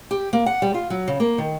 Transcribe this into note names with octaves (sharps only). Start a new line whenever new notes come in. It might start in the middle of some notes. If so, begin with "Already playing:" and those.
G4
A#3
F#5
G3
F4
F#3
C#3
A#3
D#3